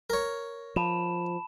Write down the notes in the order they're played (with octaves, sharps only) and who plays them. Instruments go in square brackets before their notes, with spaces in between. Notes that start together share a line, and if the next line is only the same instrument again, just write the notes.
[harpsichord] A#4 C#5
[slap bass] F3 [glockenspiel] A5 B5 E7